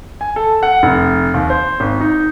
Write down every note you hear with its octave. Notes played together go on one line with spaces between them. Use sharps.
G#5
A4
F#5
F1
D#2
C5
G#1
D#4